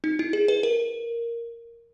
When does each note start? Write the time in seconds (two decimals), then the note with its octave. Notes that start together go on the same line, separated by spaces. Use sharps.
0.04 D#4
0.19 E4
0.33 G#4
0.48 B4
0.63 A#4